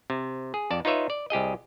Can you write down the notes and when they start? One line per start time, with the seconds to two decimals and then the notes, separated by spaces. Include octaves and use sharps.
0.10 C3
0.54 G#4
0.70 F2 D5 A5
0.85 D#4 F4 B4 C#5 E5
1.10 D5
1.30 C2 G4 G#4 D#5